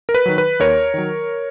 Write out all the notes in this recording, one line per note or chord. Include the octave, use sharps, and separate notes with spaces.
A#4
B4
D#3 F#3
B4
D#2 A#4 C#5
D#3 F#3